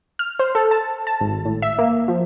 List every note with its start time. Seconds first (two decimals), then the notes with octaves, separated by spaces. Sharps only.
0.19 F6
0.39 C5
0.55 A4
0.71 A5
1.07 A5
1.21 G#1
1.45 A2
1.62 E5
1.79 A#3
2.08 F3